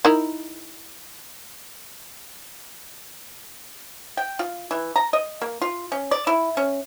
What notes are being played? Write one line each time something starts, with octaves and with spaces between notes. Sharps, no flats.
D#4 E4 A#4
G5
F4
E3
A#5
D#5
A#3
F4
C#4
D5
E4
C#4